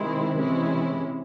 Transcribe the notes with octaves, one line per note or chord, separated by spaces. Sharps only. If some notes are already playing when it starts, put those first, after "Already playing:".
Already playing: C3 D#3 G#3 C4 E4
C3 E3 G#3 C#4 E4